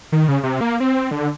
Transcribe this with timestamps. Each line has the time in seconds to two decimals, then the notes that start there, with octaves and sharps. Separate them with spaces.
0.12 D#3
0.28 C#3
0.43 C3
0.61 A#3
0.80 C4
1.11 D3